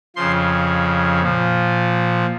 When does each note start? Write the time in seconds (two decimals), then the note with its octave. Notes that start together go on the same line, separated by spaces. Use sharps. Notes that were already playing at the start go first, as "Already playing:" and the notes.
0.16 F2 C#3 F3 C6
1.22 A#2 F3